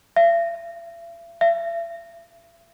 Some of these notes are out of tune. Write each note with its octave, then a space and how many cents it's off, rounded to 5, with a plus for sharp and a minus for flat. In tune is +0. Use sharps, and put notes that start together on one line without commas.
E5 +45
E5 +40